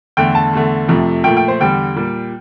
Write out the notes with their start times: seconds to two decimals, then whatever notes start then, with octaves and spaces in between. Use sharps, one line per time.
0.17 E2 D3 A3 G5
0.35 A5
0.53 E2 D3 A3
0.88 F2 C3 F3 A3
1.24 A#2 F3 A3 G5
1.37 G5
1.48 C5
1.60 E2 D3 G3 G5
1.96 A#2 G3